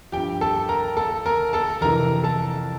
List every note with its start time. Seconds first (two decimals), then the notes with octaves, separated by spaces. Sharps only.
0.12 G2 F3 G4 G5
0.41 A4 A5
0.69 A#4 A#5
0.97 A4 A5
1.26 A#4 A#5
1.53 A4 A5
1.81 F2 C3 E3 A#4 A#5
2.23 A4 A5